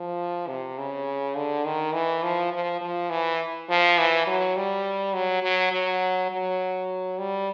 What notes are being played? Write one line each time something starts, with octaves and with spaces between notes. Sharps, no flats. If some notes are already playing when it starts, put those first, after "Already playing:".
Already playing: F3
C3
C#3
D3
D#3
E3
F3
F3
F3
E3
F3
E3
F#3
G3
F#3
F#3
F#3
F#3
G3